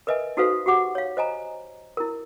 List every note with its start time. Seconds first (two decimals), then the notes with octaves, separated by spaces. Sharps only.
0.07 A#4 B4 D#5 E5 G#5
0.37 D#4 F#4 A4 B4 C5 F5
0.66 F#4 G4 F#5 D6
0.95 C#5 F5
1.17 C5 D#5 G#5 A#5
1.97 E4 A#4